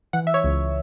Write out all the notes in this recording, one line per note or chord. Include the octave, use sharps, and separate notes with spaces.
E3 F#5
E5
C#5
C#2